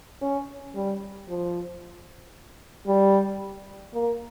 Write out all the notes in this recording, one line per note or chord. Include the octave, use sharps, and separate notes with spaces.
C#4
G3
F3
G3
A#3